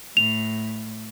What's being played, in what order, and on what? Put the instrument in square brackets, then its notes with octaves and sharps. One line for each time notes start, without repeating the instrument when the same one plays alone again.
[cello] A2 [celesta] F7